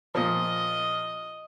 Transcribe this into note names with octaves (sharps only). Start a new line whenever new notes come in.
A#2 F3 D#5